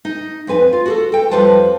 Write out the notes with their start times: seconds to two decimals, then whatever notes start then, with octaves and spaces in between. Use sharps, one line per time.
0.05 D#4
0.47 F2 C4 B4 G#5
0.73 F4
0.86 F#4 G#4 A4
1.12 A4 G5
1.31 F2 G3 F4 B4 C5 A5